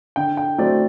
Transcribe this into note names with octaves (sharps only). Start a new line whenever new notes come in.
D3 G5
G5
F#3 A3 C4 D5